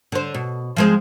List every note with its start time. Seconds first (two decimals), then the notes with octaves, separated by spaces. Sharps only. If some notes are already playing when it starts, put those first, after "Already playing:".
0.12 D3 C5
0.34 B2
0.77 F3 G#3 C4